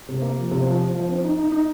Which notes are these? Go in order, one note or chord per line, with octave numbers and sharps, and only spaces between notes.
C3
A#3
F3
C3
F3
F3
F3
C4
D#4
D#4
D#4